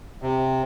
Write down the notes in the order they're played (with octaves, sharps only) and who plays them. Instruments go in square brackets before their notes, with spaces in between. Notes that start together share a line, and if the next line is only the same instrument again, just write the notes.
[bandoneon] C3